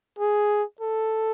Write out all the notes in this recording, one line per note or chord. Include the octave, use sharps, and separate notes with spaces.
G#4
A4